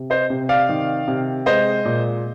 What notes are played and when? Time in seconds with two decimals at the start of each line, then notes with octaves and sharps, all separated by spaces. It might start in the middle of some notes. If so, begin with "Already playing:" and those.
Already playing: C3
0.10 C5 D#5
0.30 C3
0.49 D5 F5
0.69 D#3
1.08 C3
1.46 G#3 C5 D#5
1.85 A#2